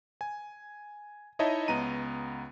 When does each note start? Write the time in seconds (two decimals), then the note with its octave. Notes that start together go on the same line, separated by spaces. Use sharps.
0.21 G#5
1.39 D#4 E4 C#5 D#5 E5 A5
1.68 C#2 B3 A#5 D#7